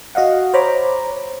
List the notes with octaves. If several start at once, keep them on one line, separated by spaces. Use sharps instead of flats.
F#4 D#5 F5 F#5
C5 C#5 A#5 B5 D6